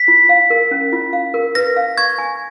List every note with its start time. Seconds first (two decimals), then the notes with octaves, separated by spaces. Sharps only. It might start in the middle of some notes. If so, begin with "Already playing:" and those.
Already playing: B6
0.08 F4
0.29 F5
0.50 A#4
0.71 C#4
0.93 F4
1.13 F5
1.34 A#4
1.55 B4 A#6
1.76 F5
1.97 C#6 G#6
2.18 G#5